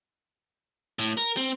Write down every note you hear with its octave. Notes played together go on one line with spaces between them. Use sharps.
A2
A#4
C4